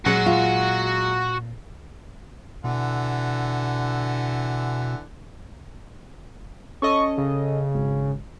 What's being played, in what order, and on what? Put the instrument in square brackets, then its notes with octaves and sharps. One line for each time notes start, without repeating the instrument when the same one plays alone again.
[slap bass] A#2 [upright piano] F#3 G#3 [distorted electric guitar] F#4 F#5
[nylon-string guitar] F4
[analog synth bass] B2 [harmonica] D3 E3 F#5
[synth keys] C#4 A4 D#5 [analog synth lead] C#6
[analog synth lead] C#3
[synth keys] G#1